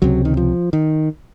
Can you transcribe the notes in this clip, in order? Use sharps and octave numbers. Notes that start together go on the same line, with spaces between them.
C#2 C3 F#3
D#3
F3
D#3